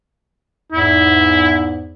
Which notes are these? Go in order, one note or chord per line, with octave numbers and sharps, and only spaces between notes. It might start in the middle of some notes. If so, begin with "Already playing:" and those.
E2 G#2 E4